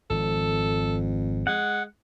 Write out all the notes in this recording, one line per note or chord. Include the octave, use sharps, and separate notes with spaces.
G#1 F2 A4
G#3 F#5